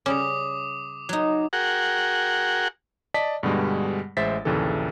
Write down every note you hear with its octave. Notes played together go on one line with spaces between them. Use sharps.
C#3 G3 C#4 D6 D#6
F#3 D#4
F#4 G#4 A#4 F#5 G5
D5 D#5 A5 B6
G2 B2 D3 G3 G#3
A1 G#3 C5 E5 A6 B6
A#1 D#2 C#3 E3 A4